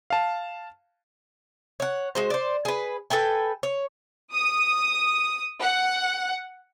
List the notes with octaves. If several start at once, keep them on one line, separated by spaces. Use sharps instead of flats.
F5 A5
C#5 F#5
G#3 F#4 C5
C5 D5
G#4 B4
A4 B4 G5 G#5
C#5
D#6
F#5